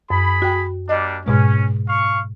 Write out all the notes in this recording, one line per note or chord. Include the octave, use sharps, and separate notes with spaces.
F#2 G#4 B5
F#4 G5
G3 A#3 D4 D#5
G#2 B2 G#3 C#4
F5 C#6